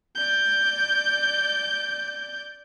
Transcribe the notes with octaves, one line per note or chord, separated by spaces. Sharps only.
D5 G6